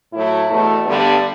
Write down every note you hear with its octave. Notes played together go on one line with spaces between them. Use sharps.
A2 F#3 A3 E4
E2 B2 A3
G2 D3 G3 B3 D4